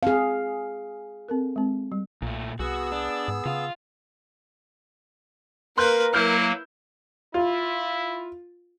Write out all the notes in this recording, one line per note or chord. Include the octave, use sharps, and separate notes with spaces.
C4 G#4 F5
C4 A4 A#4
G#3 C4
G3
B1 A#2 A3
C2 B3 F#4 G#4 E6
D4
G#2
C#3 F4 F5
A#3 A#4 B4 C6 F#6 G6
F#3 A#3 E4 F6 G6
E4 F4